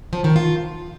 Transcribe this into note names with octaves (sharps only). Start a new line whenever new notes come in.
F3
D#3
F4